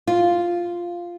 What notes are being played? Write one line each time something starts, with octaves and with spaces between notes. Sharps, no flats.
F4